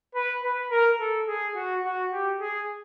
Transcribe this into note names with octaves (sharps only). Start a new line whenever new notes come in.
B4
B4
A#4
A4
G#4
F#4
F#4
G4
G#4